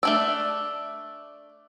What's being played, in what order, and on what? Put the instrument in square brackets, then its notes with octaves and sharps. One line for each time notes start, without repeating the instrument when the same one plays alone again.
[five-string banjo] A3 D4 D5 [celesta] E6